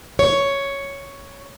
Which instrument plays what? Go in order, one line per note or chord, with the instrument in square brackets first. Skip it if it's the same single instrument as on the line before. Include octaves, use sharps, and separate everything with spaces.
[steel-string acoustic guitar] C#5